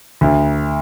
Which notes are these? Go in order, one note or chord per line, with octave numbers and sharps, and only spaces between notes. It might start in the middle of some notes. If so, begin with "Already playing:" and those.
D2